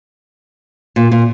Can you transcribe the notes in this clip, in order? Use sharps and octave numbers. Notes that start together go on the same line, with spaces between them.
A#2
A#2